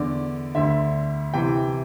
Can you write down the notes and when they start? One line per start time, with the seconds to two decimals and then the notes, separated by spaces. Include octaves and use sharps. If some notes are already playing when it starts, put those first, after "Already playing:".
Already playing: E2 D3 D5
0.55 D2 D3 E5
1.33 C3 E3 G5